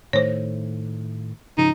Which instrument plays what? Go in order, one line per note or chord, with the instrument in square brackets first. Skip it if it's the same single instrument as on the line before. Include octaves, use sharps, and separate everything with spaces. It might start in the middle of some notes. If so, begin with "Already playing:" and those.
[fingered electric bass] A2 D#3 A3 [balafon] C5 C#5
[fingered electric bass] G#2 C#3 F3 [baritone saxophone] D#4